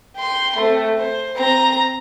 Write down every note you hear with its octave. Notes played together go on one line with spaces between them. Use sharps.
G5 C6
A3 C4
C5
C4 A#5